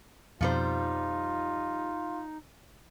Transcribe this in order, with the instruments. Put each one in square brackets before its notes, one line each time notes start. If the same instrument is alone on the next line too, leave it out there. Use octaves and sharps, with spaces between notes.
[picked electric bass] F2 B2 [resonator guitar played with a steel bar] F3 G3 C5 [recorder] D#4 [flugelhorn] F4